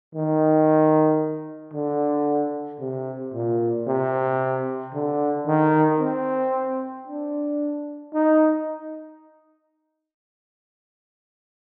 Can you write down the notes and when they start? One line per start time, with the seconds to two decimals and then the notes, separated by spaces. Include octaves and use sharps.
0.14 D#3
1.73 D3
2.80 C3
3.34 A#2
3.87 C3
4.94 D3
5.47 D#3
6.00 C4
7.07 D4
8.14 D#4